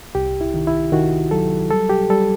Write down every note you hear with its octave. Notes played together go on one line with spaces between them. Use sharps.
C2 G4
E4
D#3
E4
D#3 F#4
F#3 A4
G3 A4
G4
G3 A4